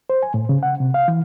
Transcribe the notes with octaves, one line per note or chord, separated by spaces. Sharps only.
C5
G#5
A2
C#3
F#5
C3
F5
E3